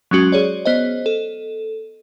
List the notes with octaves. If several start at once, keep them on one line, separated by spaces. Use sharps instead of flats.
F#3 G#3 C#4 F#4
G#4 C#5 D5
B3 C5 D#5
A4